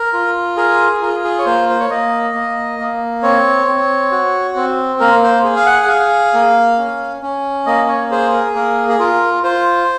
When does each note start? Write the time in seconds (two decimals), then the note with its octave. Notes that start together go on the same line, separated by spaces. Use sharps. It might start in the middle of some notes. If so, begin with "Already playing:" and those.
Already playing: A#4
0.13 F4
0.57 G#4 A#4
1.01 F4 A#4
1.09 G#4
1.24 G#4
1.39 C#5
1.46 A#3 C5
1.69 C5
1.80 C#5
1.90 A#3 D#5
2.34 A#3
2.79 A#3
3.23 C4 C#5
3.67 C4
4.12 F#4
4.56 C4
5.00 A#3 A#4
5.23 C5
5.44 G#4
5.56 F5
5.66 F#5
5.82 F#5
5.89 G#4 F5
6.34 A#3
6.78 C#4
7.22 C#4
7.66 A#3 D#5
7.88 C#5
8.11 G#4 C5
8.33 A#4
8.55 A#3 A#4
8.89 G#4
8.99 F4 A#4
9.43 F4 C5